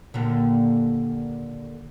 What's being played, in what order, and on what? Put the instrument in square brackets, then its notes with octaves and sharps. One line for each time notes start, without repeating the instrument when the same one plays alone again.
[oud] D#2 A#2 D3